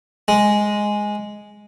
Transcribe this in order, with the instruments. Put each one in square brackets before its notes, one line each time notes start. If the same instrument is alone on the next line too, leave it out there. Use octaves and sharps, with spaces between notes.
[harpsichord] G#3